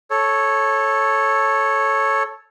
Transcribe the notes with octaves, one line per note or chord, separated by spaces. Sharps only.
A4 C#5